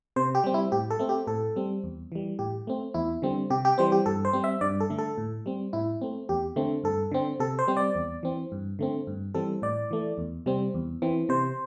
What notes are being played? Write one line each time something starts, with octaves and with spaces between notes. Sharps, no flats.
C3 C5
G4
G3 C4
E4
A2 G4
A4
A3 C4
G4
A2 A4
G3 C4
E2
E3 G3
A2 G4
A3 C4
E2 E4
D3 G3 C4
C3 G4
G4
E3 G3 C4 C5
G4
G2 A4
C5
G3 C4
E5
G2 D5
A4
D3 A3
A4
A2
G3 C4
A2 E4
A3 C4
E2 G4
D3 A3 C4
G2 A4
D3 C4
C3 A4
C5
G3 C4
D5
E2
E3 C4
G2
D3 A3 C4
G2
E3 G3 C4 A4
A2 D5
E3 A3
E2
C3 G3 C4
E2
E3 C4
C3 C5